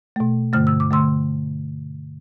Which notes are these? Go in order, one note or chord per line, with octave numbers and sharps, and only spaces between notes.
B2 A3
G2 D3 A3 F6
E6
D6
D3 A3 C6 E6